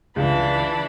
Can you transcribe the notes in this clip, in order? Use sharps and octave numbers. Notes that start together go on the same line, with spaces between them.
C#2 E3 D4 B5